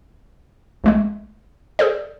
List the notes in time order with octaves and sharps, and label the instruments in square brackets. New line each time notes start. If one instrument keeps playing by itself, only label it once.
[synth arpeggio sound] A#1 G#3 A3
G#4 A4 C5 D5